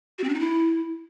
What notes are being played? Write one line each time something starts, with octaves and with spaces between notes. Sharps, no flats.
F#4
C4
D4
D#4
E4